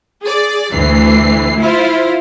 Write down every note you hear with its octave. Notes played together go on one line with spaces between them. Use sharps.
G#4 D5
D2 E3 C7
E4 F4 C5